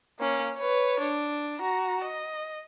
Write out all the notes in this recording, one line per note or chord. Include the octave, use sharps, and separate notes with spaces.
A#3 C#4
B4 C#5
D4
F#4 A#5
D#5